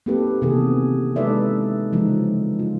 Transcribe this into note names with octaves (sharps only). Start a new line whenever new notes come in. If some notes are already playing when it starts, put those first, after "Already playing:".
A#3 C4 D#4 G4 A4 B4
C3 D#3 E3 B3 G#4 A4
G#3 D#4 A4 B4 D5 E5
C#3 E3 F3 G#3 D#4
F4